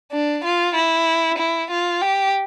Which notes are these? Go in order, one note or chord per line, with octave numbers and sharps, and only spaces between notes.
D4
F4
E4
E4
F4
G4